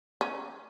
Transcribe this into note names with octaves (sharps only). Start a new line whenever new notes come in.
C#4